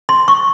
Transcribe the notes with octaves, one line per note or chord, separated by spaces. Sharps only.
C6
C#6